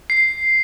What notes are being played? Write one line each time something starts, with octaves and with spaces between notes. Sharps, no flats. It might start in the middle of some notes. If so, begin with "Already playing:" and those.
C7